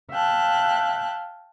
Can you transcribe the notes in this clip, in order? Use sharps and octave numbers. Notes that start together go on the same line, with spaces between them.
E5 F5 G5 A5 F#6